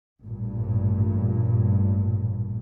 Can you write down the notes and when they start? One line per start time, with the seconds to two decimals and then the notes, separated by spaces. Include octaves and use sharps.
0.24 A1 G2 A#2